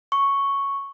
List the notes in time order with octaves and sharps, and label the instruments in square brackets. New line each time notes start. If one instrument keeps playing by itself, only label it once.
[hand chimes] C#6